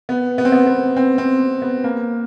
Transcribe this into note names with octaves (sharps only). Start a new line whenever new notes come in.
B3
B3
C4
B3
B3
C4
C4
B3
A#3